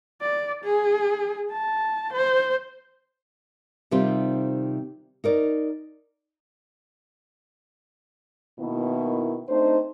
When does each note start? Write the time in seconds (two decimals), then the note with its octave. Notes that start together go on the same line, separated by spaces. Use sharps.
0.22 D5
0.64 G#4
1.51 A5
2.13 C5
3.91 C3 D#3 G3 C4 F4
5.24 D#4 A#4 D5
8.59 B2 D#3 A#3 B3 E4
9.49 A3 C4 D4 D#4 C5